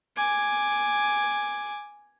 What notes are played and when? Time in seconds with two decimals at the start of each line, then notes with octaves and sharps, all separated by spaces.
0.17 G#5 D6